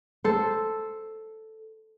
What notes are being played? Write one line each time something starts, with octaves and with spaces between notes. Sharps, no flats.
A4 C5